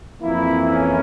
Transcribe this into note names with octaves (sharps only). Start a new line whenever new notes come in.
F2 E3 A#3 E4
C#4